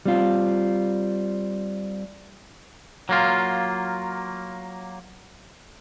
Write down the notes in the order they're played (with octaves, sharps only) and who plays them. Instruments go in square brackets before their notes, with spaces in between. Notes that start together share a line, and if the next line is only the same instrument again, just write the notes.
[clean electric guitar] G3 C4 F4
F#3 A#3 F4